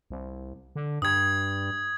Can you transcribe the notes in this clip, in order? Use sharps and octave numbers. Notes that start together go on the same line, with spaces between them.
C2
D3
G2 D#6 G#6